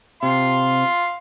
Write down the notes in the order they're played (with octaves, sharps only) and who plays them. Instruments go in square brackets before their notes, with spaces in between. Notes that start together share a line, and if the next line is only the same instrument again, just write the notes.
[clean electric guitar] C3 [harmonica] F5 C6